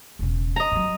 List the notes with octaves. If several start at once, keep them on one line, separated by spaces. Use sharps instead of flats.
E1 C#3
D#5 A#5
G2 F#3